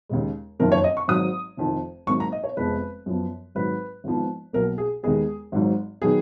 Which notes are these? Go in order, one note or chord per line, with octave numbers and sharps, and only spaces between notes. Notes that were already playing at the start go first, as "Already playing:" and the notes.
D#2 C#3 G#3
F#1 F2 D#3 A#3 A#4
C#5
D#5
C#6
G#1 G#2 F#3 D#6
F1 F2 D#3
G#1 G#2 F#3 A#3 C#6
A#5
D#5
C#5
F1 F2 F3 G#3 B3 B4
F#2 F3 B3
G#1 G#2 F#3 B4
G#1 G#2 F3 B3
B1 B2 A#3 A#4
G#4
D#2 D#3 G#3 B3 G#4
G#1 G#2 F#3
D#3 F#3 B3 G#4